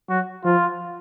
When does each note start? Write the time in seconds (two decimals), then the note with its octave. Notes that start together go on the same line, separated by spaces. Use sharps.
0.09 F#3 F#4
0.44 F3 F4